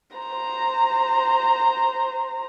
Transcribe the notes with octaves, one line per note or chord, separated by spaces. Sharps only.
C5 A#5